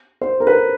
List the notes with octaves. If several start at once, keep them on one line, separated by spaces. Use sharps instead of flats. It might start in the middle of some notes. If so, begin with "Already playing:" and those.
C5
A#4
B4